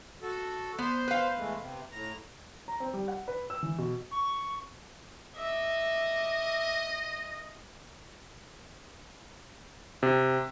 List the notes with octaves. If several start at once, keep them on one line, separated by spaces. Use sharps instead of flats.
F#4 A4
B3 C5
B4 F5
E3 G#3 A3
C3
A2 A#5
A#5
C4
G3
F#5
B4
E6
E3
B2
C#6
D#5 E5 D6
C3